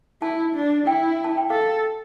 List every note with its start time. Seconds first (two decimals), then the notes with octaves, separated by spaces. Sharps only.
0.22 E4 A5
0.55 D4
0.87 E4 G5
1.24 A5
1.37 G5
1.50 A4 F5